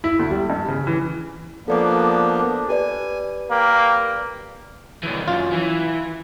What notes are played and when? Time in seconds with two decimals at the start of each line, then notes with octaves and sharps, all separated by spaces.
0.04 E4
0.19 D2
0.31 G3
0.50 G2
0.68 C#3
0.87 E3
1.68 F3 A#3 B3 D4 A4 D5 D6
2.69 G4 B4 D5 G#5
3.51 A#3 G5 B5
5.03 C2 E3
5.28 F#2 F4
5.52 E3